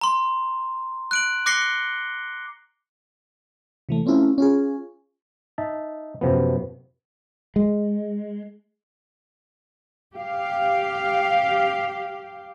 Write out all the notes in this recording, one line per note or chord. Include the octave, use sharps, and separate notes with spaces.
A#5 C6
F#6 D7 F#7
D6 F#6 A#6 C7 C#7 G7
C3 E3 A3
A3 C4 C#4 E4 F4
C#4 F4 G#4
D#4 E5 A5
F#2 C3 F3 B3
G#3
G4 F5